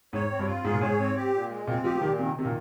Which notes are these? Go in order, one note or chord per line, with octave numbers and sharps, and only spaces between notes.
G#2 C#5
C4
G2
F4
G#2 G#4
A#2
G#2 C#5
C4
G4
A#2
G#3
A#2 C4
F3 G4
F3
A#2 D#3
C3 D#3
C3 D#3
A#2